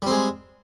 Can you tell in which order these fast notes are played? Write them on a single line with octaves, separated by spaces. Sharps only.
G3 C4 G#3